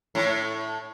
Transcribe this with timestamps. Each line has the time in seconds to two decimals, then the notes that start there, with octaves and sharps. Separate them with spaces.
0.15 A2